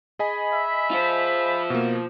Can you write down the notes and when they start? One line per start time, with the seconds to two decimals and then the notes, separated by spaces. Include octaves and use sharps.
0.19 G#4 D#5 G#5 B5
0.53 E5
0.91 F4 C5
1.70 B2 A#3